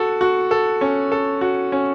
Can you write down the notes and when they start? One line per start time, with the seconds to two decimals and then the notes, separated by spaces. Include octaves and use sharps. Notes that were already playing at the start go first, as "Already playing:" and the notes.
Already playing: F#4 A4
0.21 F#4
0.51 A4
0.81 C#4
1.12 A4
1.41 F#4
1.72 C#4